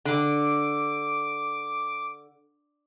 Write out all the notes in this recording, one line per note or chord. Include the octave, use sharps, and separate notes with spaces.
D3 D6